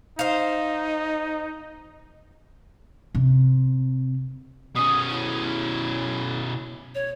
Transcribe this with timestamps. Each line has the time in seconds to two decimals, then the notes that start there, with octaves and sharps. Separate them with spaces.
0.19 D#4 C5 F5
3.15 C3
4.76 B2 C#4 D#6
5.10 E4
6.95 C#5